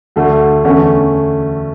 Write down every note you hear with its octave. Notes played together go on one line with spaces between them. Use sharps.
D2 D3 A3
E2 D3 A3 C#4